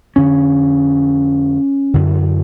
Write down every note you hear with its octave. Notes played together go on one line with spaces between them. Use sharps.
F2 D3 C#4
F#2 D3